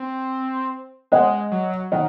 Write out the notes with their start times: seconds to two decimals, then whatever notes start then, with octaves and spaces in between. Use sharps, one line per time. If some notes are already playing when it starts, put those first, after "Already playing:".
Already playing: C4
1.12 G#3 D#5 F#5
1.52 F#3
1.92 D#3 D#5 F#5